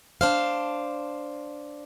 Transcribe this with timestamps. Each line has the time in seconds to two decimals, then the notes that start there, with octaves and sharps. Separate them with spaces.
0.21 D4 C5 F5